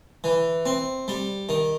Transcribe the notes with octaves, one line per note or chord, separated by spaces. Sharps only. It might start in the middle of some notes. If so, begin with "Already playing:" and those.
E3
C4
G3
D#3